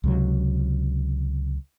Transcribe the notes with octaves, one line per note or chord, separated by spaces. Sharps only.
C#2 C3 F#3